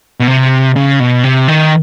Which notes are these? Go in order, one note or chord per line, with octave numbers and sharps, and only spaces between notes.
B2
C3
C#3
B2
C3
D#3